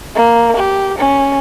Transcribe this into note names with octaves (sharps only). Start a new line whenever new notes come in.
A#3
G4
C#4